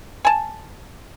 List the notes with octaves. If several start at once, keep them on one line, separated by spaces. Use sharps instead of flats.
G#5 A5